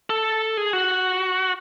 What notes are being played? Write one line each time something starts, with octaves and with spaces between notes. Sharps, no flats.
A4
G#4
F#4